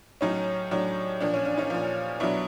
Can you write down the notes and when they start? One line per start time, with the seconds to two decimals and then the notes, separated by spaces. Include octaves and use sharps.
0.21 A2 F#3 C#4 D#4
0.71 A2 F#3 D4
1.21 A#2 F3 D4
1.34 C#4
1.45 D4
1.58 C#4 D#4
1.70 A#2 F3
2.20 B2 F#3 D4 E4